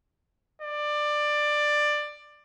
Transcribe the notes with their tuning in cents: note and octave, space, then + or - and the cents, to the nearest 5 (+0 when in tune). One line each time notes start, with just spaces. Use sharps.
D5 +15